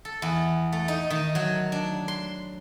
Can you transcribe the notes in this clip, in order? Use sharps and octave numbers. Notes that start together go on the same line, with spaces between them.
A4
E2
A3
D#4
D#3
F#3
D4
C6